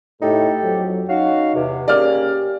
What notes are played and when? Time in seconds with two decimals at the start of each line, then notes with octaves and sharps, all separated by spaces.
0.22 A2 D#4 G4 A4
0.64 F2 F#3
1.09 C#4 D#4 F#4 F5
1.54 E2 C3
1.88 C#3 A#3 C#4 G4 D5 F6